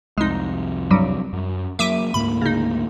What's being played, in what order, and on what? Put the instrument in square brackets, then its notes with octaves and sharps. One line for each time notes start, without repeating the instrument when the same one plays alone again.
[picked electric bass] C2 F2 [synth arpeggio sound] G#3 D#4
[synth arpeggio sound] G2 F#3 G3
[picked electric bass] F#2
[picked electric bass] F#3 A#3 [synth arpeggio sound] E5 D6 D#7
[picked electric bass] D2 G#2 A#3 [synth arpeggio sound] B5
[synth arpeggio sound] C#3 D#4